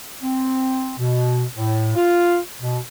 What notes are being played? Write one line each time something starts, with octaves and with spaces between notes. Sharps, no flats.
C4
B2
A2
F4
B2